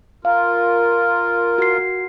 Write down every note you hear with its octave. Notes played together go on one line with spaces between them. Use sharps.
F4 A#4 F5
F#4 C7